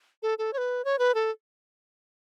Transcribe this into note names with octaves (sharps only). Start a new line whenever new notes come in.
A4
A4
C#5
B4
C#5
B4
A4